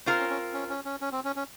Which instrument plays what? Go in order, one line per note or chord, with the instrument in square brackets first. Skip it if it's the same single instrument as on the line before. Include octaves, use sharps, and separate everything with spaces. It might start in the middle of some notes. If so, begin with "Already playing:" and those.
[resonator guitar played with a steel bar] C4 F4 A#4
[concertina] C#4
C#4
C#4
C#4
C#4
C#4
C4
C#4
C#4